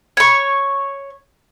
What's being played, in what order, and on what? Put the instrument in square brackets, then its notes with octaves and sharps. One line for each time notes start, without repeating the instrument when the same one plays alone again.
[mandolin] C#5 C#6